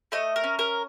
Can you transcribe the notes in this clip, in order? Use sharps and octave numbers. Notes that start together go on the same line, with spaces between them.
A3 D#5
A#4
C#4
A#4